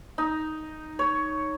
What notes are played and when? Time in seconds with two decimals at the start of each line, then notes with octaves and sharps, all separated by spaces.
0.18 D#4
0.99 C#5